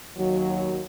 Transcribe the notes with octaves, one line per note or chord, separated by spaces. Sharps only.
D#2 F#3